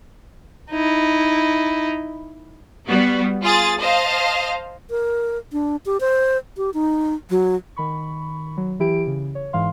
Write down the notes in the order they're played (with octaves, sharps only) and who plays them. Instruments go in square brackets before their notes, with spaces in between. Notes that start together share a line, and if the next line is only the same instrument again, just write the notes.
[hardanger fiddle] D#4 E4
[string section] G3 B3 F#4
F4 G#4 D#6 A6
C5 D#5 F5 A5
[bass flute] A#4
D4
G4
C5
G4
D#4
F#3
[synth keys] D#3 B5 C#6
F#3
E3 E4 G4 D7
C#3
C#5
G#2 E3 F5 C6